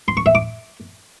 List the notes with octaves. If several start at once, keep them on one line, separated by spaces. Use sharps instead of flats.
C6
C#6
E5
D6